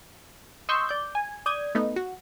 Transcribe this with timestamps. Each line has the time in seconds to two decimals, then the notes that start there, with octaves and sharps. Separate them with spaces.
0.69 D#5 C6 C#6 E6 G6
0.89 D5 G6
1.15 G#5
1.46 D5 D#6 G6 G#6
1.75 A3 B3 D#4
1.96 F#4